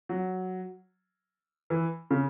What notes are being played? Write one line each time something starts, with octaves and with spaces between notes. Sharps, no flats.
F#3
E3
C#3